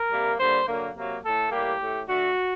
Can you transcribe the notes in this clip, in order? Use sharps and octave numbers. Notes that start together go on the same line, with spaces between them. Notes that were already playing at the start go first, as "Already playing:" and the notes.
Already playing: A#4
C3 G3 A#3
D3 G3 A#3 C5
D3 F#3 A#3
C3 F#3 A#3
A2 A3 A4
A2 G3 A#3 G4
A2 A3
D3 A3 F#4